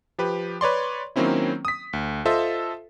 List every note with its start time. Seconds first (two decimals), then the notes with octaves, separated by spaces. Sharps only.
0.18 F3 G4 B4
0.61 B4 C#5 D5 C6
1.16 D#3 F#3 A#3 C4 C#4 E4
1.65 D#6 B6
1.93 D2
2.25 F4 A4 C5 D#5 E5